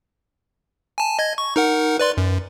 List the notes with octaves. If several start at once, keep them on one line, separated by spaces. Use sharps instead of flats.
G#5 A5
D#5 G#6
C#6
D#4 A#4 F#5
B4 D5 C6
F#2